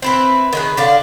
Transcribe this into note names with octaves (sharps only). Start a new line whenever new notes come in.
C4 E4 B4
D#3 G#4 B4
D3 D5 F5